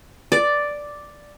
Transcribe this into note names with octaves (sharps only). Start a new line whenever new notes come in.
D5